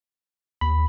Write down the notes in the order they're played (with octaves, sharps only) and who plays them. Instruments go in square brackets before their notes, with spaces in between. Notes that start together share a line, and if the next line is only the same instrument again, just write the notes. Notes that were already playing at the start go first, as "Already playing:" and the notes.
[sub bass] D#2 [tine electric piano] B5